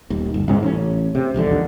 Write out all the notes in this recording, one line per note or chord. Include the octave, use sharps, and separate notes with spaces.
D#1 D#2
G1
C2 G#2 C#4
A1 C#4
C3
E1 A#1 D#2 D3